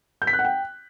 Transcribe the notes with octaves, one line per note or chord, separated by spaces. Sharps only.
G6
B6
F#6
F#5
G5